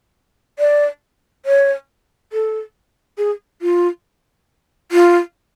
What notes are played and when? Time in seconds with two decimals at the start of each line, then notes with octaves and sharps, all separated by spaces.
0.59 D5
1.46 C#5
2.33 A4
3.18 G#4
3.62 F4
4.92 F4